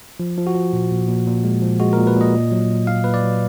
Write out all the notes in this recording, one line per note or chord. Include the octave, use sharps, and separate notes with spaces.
F3
F3
F#4
F3
A#2
A#2
A#2
A#2
G#3
F3
G#3 F#4
A#2 A#4
B4
A#2
D#5
A#2
F#3
A#2
A#2 F5
A#2 B4
D5
F#3